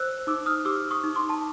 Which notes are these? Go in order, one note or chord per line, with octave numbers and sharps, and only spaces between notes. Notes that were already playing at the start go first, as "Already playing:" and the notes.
Already playing: C5 E6 F#6
D#4 D6 E6
D#6 F6
G4 D6 E6
C#6 D#6
D#4
C6 D6
A5